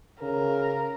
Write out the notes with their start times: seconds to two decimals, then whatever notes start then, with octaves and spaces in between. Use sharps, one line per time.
0.22 C#3 A#4